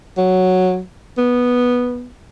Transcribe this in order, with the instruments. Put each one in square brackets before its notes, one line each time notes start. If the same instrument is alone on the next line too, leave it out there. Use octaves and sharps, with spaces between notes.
[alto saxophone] F#3
B3